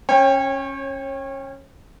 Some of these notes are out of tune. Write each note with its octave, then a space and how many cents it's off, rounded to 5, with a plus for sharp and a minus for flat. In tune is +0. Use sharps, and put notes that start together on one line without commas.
C#4 -15 C#5 -30 G5 +20